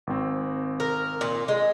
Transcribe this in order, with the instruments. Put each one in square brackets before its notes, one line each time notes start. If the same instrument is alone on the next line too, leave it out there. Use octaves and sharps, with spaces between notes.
[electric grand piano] G#1 C4
[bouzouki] A#4
A#2
G#3